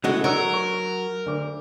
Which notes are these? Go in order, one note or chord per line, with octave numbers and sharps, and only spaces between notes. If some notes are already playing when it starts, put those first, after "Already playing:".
C#3 E3 G#3 A3 F#4
D3 F#3 A#4 C#6 E6
C#6
D2 D6